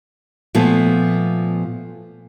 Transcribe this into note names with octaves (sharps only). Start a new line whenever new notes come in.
A#2 F3 A3 B3